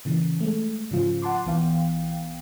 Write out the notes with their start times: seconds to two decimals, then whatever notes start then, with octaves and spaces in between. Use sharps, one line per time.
0.05 A#2 C#3 E3
0.40 G#3 A3
0.91 G#2 C#3 F3 F4
1.22 F#5 A5 C6 D6
1.46 B1 E3 B3 F5 G5